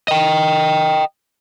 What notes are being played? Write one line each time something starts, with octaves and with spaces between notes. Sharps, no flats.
D#5 G5